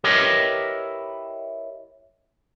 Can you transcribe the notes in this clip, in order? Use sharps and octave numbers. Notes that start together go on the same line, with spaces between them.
E4 G4 A#4 B4 C#5 D#5